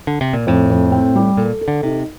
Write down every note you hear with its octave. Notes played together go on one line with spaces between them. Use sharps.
D3
C3
A#2
F2 A2
F2
C4
G3
A#2 A4
A4
D3
C3 D#4